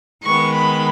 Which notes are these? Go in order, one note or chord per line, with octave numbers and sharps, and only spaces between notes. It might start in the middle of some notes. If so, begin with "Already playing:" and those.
D#3 G#3 B3 C#6
B5